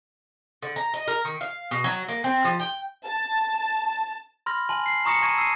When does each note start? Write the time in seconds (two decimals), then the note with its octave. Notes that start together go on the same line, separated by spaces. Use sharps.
0.63 D3
0.76 A#5
0.94 D#5
1.08 A#4
1.25 D#3
1.41 F5
1.71 B2
1.84 F#3
2.08 A#3
2.24 C4
2.45 F3
2.60 G5
3.05 A5
4.46 B5 C6 F6 A#6
4.69 G#5 A5 C6 F6 F#7
4.86 C7
5.05 A#5 C#6 D#6 A#6 C#7 E7
5.22 A5 C#6 G#6 A#6 D#7 E7
5.38 E6 C7 D#7